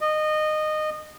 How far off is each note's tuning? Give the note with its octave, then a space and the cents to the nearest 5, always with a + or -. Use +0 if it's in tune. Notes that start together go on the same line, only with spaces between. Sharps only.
D#5 -20